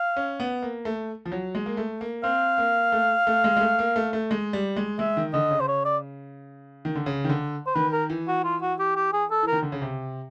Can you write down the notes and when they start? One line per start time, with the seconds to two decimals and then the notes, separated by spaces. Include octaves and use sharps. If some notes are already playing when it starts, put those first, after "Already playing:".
Already playing: F5
0.16 C#4
0.40 B3
0.62 A#3
0.85 A3
1.25 F3
1.32 F#3
1.55 G#3
1.66 A#3
1.77 A3
2.01 A#3
2.23 C4 F5
2.58 A#3
2.92 A3
3.27 A3
3.44 G#3
3.57 G#3
3.61 A3
3.79 A#3
3.96 A3
4.13 A3
4.31 G#3
4.53 G3
4.76 G#3
4.99 G#3 E5
5.17 D#3
5.33 D3 D#5
5.51 C#3
5.60 C5
5.68 C#5
5.85 D5
6.85 D#3
6.95 D3
7.06 C#3
7.24 D#3
7.29 D3
7.67 C5
7.75 D#3 B4
7.93 A#4
8.10 E3
8.27 F#4
8.44 F4
8.62 F#4
8.79 G4
8.96 G4
9.13 G#4
9.31 A4
9.43 E3 A#4
9.53 D#3
9.63 D3
9.72 C#3
9.82 C3